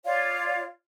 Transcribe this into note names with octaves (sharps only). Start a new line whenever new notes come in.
F4 C#5 D5 F5